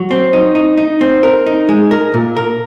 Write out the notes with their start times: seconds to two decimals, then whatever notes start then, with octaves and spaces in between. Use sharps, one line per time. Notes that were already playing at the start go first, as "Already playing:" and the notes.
Already playing: F#3
0.11 C4
0.33 D#4
0.55 D#4
0.77 D#4
1.01 C4
1.23 A#4
1.46 D#4
1.69 G#3
1.91 A#4
2.14 A#2
2.37 A#4